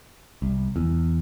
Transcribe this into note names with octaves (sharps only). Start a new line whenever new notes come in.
C2
E2